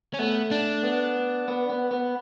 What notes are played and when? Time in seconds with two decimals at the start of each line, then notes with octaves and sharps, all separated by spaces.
0.14 C#4
0.19 A3 B3
0.51 D4
0.83 B3
1.48 B3
1.70 B3
1.91 B3